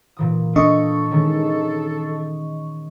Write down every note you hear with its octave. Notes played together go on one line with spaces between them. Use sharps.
A#2 E3 D#6
D4 A4 D#5 C#6 D#6
D#3 G#3 C#4